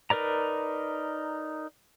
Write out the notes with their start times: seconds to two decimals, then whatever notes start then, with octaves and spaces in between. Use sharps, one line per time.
0.10 D#4 A#4 B4 D5 A#5